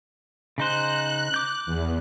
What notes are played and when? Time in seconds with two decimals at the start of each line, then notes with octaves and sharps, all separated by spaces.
0.58 C#3 D#4 C5 F#6
1.34 D6 G6
1.66 E2